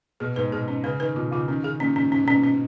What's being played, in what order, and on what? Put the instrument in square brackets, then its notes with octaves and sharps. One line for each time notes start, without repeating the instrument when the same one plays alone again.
[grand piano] B2 [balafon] G#4
[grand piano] G#2 [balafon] B4
[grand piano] B2 [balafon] G#4
[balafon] C#4
[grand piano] C#3 [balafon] B4
[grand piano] D#3 [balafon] B4
[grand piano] B2 [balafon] F4
[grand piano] C#3 [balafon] F4
[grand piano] D#3 [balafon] C#4
[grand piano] C#3 [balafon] G#4
[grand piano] A#2 [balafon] C#4
[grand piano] G#2 [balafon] C#4
[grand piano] G#2 [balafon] C#4
[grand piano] B2
[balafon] C#4
[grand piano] A#2
[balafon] C#4